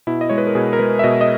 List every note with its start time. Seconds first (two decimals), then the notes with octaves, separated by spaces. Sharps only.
0.07 B2 E4
0.21 D#5
0.29 G#3 C#5
0.38 B4
0.47 A#4
0.55 B2 G#4
0.73 A#4
0.79 G#3 B4
0.99 E5
1.04 B2 D#5
1.21 D#5